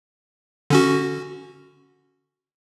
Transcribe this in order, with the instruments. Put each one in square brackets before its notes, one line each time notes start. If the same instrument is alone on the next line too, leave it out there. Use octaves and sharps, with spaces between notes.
[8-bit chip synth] D3 C#4 F#4